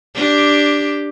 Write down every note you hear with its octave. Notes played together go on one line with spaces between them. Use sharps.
D4 G4